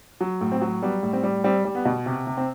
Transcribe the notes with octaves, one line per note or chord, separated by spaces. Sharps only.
F#3
A2
C4
F#3
G3 B3
A2
C4
G3
G3 C4
G3
B3
B2
C3
C3
C4